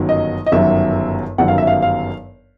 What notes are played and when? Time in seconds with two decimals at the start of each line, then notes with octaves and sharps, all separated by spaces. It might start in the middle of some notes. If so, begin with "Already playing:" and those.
Already playing: G1 F#2 D#3 F#3
0.09 D#5
0.46 D#5
0.52 G1 F#2 D#3 F#3 E5
1.38 G1 F#2 D#3 F#3 F#5
1.48 F5
1.58 E5
1.67 F5
1.82 F5